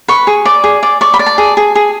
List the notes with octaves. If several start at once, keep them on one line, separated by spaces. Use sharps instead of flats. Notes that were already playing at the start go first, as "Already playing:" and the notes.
B4 C#6
G#4
D5
G#4
D5
D5 C#6
B5
D5
A5
G#4
G#4
G#4